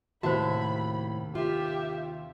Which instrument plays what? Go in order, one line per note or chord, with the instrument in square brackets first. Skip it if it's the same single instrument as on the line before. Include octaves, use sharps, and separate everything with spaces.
[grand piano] D#2 C3 [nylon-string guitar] A2 E5 A5 [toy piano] F#4 C5 [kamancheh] B5
[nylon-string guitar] F4 [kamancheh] G4 E5